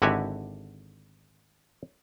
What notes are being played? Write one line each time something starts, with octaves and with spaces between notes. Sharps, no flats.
G#1 D3 E4 F#4 G4 G#5